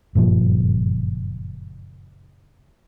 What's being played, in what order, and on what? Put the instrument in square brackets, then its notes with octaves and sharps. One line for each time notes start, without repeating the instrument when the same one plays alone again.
[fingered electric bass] F#1 G2 A#2 F3